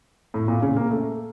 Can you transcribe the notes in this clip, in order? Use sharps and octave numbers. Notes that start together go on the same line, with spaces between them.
A2
A#2
C#3
A#3
A3